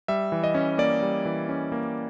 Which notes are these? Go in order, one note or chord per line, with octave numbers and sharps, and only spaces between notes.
G3 E5
E3
D#5
C#4
A#3 D5
G3
E3
C#4
A#3